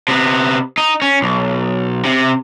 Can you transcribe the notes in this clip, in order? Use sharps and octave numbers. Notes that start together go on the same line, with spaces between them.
C3 B3
D#4
C#4
B1
C3